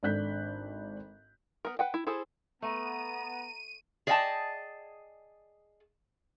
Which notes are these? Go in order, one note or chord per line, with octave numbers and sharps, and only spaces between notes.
G#1 D4 A4 F#6 G6 B6
B3 A#4
B4 F#5 G5
E4
E4 G#4 A4 C5
A3 B3 A#5 D#7
G#4 D5 D#5 F5 G5 A5